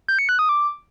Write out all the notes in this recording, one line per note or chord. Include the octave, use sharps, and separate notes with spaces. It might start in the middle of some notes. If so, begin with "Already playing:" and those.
G6
C#7
F#6
D#6
D6